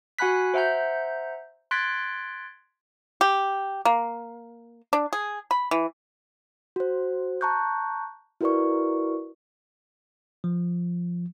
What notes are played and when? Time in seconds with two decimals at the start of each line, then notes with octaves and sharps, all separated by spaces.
0.19 F#4 F#5 G#5 B5 F#6 B6
0.54 C5 E5 F#5 A#5 G6
1.71 C6 F#6 G#6 A6 B6 D7
3.21 G4
3.85 A#3
4.93 D4
5.13 G#4
5.51 B5
5.71 E3
6.76 F#4 C5
7.41 A5 A#5 C#6 F#6 G6
8.41 E4 F#4 A#4 B4 D5 C#6
10.44 F3